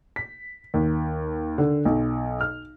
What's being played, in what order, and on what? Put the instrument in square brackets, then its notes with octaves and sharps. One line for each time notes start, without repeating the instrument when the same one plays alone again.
[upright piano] B6
D#2
D3
B1
F6